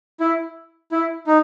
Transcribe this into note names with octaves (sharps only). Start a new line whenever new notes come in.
E4
E4
D#4